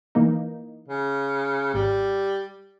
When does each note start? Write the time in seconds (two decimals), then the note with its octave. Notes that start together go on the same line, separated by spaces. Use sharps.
0.15 E3 A#3 D#4
0.88 C#3
1.74 G#1 G3